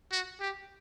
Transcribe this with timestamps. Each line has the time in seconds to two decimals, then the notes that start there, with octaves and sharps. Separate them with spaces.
0.12 F#4
0.40 G4